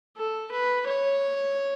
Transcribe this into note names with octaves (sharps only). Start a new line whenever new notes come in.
A4
B4
C#5